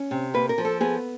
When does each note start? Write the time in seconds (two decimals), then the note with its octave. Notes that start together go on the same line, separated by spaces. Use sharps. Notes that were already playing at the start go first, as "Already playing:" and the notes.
Already playing: C#4
0.11 C3
0.34 A#3 B4
0.49 A#4
0.58 F3
0.65 A4
0.80 B3 G#4